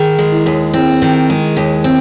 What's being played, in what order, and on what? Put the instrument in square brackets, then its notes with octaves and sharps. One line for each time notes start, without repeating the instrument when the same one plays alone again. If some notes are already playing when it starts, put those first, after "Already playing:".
Already playing: [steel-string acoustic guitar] D#3 [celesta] G#4
[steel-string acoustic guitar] G#3
[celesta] E4
[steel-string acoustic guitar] D#2
[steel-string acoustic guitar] C4 [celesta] E4
[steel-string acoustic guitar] D#3
G#3
D#2
C4